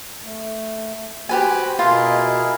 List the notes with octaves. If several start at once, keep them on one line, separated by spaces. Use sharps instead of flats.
A3
F#4 G4 B4 C5 G#5
B2 E4 F4 G#4 A#4 D#5